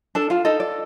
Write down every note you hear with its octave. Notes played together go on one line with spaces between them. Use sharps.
D4 A4 A5
F4 F5
D#4 A4 D#5
D5